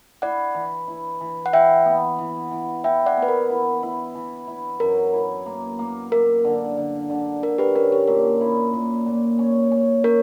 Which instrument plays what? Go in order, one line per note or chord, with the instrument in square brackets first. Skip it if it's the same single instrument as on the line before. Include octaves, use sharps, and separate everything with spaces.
[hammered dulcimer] E4 [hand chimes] D5 F#5
[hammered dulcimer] E3
E4
E3
[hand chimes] F#5
[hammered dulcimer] E3 [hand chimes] E5 G5
[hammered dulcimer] B3
E3
E3
[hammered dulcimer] E4 [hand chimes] E5 G5
[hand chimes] D5 F#5
[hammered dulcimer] B3
[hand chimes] B4
A#4
[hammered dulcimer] E4
E4
E3
E4
[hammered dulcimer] F#2 [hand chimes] A#4
[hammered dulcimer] E4
A#3
A#3
[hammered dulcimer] A#3 [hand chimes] A#4
[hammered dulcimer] D3
D3
D3
[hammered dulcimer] D3 [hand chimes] A#4
[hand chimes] G4 B4
[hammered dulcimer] C#4 [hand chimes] A#4
[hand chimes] G4
[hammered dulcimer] A#2 [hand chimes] A#4
[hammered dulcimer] E4
A#2
A#2
C#4
C#4
[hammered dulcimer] C#4 [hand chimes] A#4 C#5